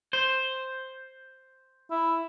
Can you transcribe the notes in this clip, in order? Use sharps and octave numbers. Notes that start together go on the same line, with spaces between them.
C5
E4